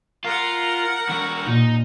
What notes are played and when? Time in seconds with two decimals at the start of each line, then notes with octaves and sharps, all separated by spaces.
0.24 F4 A#4 F#5
1.09 E2 F#4
1.46 A#2 D#4